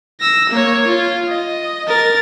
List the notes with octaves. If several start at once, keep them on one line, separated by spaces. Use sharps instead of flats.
E6 A#6
A#3 C#5
F4
D#5
A#4 A6